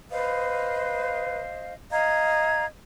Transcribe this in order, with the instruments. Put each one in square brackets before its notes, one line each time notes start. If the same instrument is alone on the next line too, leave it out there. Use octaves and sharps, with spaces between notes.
[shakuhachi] B4 [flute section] C5 D#5 F5
[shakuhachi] D#5 [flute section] F5 A#5 G#6